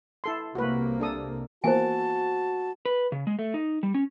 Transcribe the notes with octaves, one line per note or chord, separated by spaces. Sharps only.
E4 A4 C6
C2 C3 A#3 F#4 B4
D4 A4 D#6
E3 A#3 B3 F#4 C5 G#5 A5
B4
C#3
G#3
A3
D#4
G3
C#4